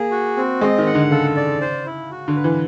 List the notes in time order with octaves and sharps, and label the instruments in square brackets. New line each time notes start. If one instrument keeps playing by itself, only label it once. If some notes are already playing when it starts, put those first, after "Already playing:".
Already playing: [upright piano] A#3 [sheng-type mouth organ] G#4
[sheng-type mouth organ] F#4
C4
[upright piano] G#3 [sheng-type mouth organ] D#5
[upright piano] D#3
[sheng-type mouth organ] F#5
[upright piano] D3
[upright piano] C#3 [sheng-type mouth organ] A4
[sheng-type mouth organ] D5
C5
E4
F#4
[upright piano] D3
[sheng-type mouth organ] B4
[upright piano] E3